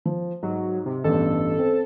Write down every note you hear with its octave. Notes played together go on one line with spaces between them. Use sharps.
F3
G#2 F#3
C3
A1 E2 G2 A4
C4